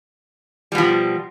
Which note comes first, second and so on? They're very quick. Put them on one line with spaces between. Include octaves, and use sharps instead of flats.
G3 B2 F3